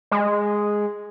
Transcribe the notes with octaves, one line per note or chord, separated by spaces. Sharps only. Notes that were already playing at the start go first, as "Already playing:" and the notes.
G#3